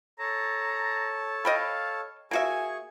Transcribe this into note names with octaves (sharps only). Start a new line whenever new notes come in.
A4 C#5 A5 A#5
D#5 F5 G5 B5
A#3 F#4 G#4 E5 G#5 C#6